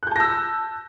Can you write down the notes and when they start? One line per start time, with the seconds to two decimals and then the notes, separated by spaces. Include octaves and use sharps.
0.03 F#6
0.07 G6
0.11 A5
0.16 A#6
0.20 E6